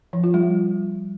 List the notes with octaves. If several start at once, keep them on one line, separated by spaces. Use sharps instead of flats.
F3
F4
G3